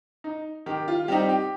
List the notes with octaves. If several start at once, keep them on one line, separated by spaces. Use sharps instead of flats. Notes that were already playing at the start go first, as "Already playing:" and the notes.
D#4
D#3 G4
F4
G3 C4 D#4 G4
G4